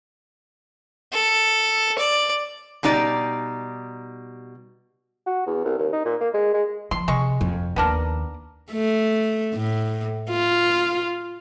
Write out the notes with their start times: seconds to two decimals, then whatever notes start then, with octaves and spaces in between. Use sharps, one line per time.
1.13 A4
1.98 D5
2.83 B2 G3 D#4 D5
5.27 F#4
5.47 E2
5.64 C2
5.78 D#2
5.93 D#4
6.05 A#2
6.21 A#3
6.34 G#3
6.54 G#3
6.91 F3 C6
7.08 C3 G#3 C#6
7.41 F2
7.76 D#2 D#3 B3 D4 A#4
8.72 A3
9.54 A2
10.30 F4